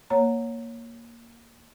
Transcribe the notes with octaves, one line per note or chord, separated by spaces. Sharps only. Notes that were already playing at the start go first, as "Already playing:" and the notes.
A#3 C#5 A#5